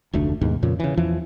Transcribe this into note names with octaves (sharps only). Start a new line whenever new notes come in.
F1 D2 A3 D4
D#2 G#2 B2
F2 A#2 C#3
C#3 E3
E2 E3 F3